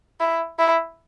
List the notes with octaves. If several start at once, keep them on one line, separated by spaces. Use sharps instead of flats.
E4
E4